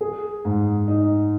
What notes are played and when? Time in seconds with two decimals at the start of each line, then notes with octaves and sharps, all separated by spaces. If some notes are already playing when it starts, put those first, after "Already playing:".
0.01 G#4
0.45 G#2
0.88 D#4